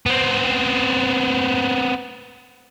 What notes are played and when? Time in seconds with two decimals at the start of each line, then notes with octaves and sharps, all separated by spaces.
0.06 B3 C4